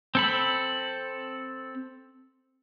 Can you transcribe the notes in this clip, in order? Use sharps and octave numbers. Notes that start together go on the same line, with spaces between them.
C4 A4 B5